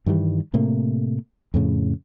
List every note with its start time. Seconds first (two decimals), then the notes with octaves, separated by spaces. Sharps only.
0.06 G2 D#3 E3 G3
0.53 A2 C3 A3 A#3
1.54 F2 A2 C#3